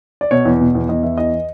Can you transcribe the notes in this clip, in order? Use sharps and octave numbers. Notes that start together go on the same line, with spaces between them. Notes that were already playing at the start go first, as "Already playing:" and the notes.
D5
B2 C#5
E2
B2
E2
E2 D#5
E3 E5
E2 D#5